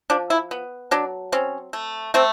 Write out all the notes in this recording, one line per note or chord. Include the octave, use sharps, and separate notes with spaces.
F3 D4
E4
B3
F#3 D4
C4 C#4
A3
A3 C4